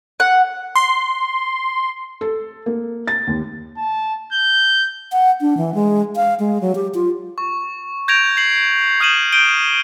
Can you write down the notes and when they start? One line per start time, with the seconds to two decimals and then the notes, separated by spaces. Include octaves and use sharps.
0.20 F#5
0.75 C6
2.21 A4
2.66 A#3
3.07 A6
3.27 D#2
3.77 A5
4.33 G6
5.12 F#5
5.41 D4
5.57 E3
5.74 G#3
6.16 F5
6.40 G#3
6.61 F#3
6.75 G4
6.94 F4
7.38 C#6
8.08 G6 G#6 A#6 D7 F7
8.37 C7 F#7
9.00 D#6 F6 G6 D#7 E7 F#7
9.32 G6 D7 D#7 G7